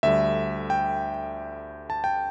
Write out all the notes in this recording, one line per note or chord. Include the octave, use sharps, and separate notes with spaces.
D2 D3 G3 E5
G5
A5
G5